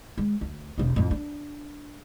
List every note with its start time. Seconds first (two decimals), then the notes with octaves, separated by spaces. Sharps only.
0.18 G#3
0.41 D2
0.78 E1 C4
0.96 F2 A2
1.11 D4